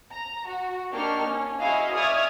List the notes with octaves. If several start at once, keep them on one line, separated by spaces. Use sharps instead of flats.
A#5
F#4
A#3 D4 D#4 G4 C#6 F6
C#4
E4 F#4 G#4 D#5 F5
D5 E5 C#6 D#6 F6 G#6